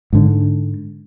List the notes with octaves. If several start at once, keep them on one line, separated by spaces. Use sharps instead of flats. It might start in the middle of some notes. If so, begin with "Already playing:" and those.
G#2 D3